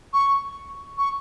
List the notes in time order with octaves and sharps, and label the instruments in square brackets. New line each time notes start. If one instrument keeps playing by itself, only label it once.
[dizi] C#6
C#6